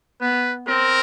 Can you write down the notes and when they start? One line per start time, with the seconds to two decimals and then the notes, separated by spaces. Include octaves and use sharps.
0.21 B3 B4
0.68 C4 A#4